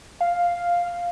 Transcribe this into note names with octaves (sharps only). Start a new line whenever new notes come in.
F5